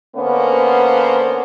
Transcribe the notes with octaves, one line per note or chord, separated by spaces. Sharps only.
D3 A#3 B3 C#4 C5